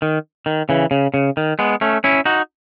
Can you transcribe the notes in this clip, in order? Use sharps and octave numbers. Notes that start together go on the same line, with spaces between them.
D#3
D#3
C#3 E3
C#3
C#3
D#3
G#3 B3
A3 C#4
C#4 E4
D#4 F#4